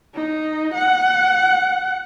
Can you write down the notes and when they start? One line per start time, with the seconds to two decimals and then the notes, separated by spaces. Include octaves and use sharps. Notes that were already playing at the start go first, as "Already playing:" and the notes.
0.14 D#4
0.74 F#5